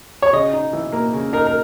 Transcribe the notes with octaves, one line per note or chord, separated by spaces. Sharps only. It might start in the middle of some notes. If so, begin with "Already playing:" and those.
C#5
C#3 D#5
D#4
E3
A#3
C#3
D#4 A#4
A#4